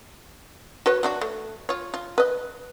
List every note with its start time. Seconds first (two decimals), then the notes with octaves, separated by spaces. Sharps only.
0.86 F#4 B4 C#5
1.03 F#3 D4 F#4
1.21 A3
1.69 F4 C#5
1.94 F4
2.18 B4 D#5